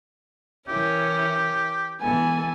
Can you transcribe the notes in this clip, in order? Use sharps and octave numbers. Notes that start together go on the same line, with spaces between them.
E3 C#4 E4 G4 A#4
E3 G#3 B3 A4 G#5